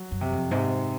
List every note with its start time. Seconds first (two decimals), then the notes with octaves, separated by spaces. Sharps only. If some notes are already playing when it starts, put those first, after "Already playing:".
Already playing: F#3
0.11 F#2
0.21 C3
0.32 F2
0.51 G#2 C3